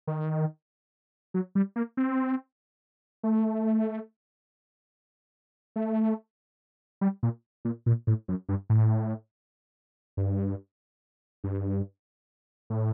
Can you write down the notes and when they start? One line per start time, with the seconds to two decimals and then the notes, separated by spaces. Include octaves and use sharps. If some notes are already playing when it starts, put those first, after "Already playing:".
0.07 D#3
1.34 F#3
1.55 G3
1.76 A#3
1.97 C4
3.23 A3
5.76 A3
7.01 G3
7.23 A#2
7.65 A#2
7.86 A#2
8.07 A2
8.28 F#2
8.49 G2
8.70 A2
10.17 G2
11.44 G2
12.70 A2